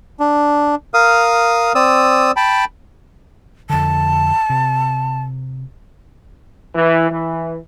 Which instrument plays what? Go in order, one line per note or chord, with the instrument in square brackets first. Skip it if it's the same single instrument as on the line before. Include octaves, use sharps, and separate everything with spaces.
[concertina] D4
A#4 F5 D#6
C4 D5 D#6 E6
G5 A5 B5
[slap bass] F2 D3 [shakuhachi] A5
[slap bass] C3
[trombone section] E3
E3